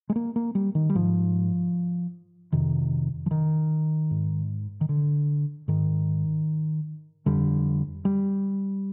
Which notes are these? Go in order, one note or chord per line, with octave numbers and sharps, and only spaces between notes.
G#3
A#3
A#3
G3
D#3
G3
G#2 F3
F2 C3 D#3
F3
D#3
G#2
D#3
D3
G#2 D#3
F2 D3 G3
G3